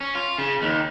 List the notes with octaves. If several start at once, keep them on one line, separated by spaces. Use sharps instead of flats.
C#4
F4
C#3
D#2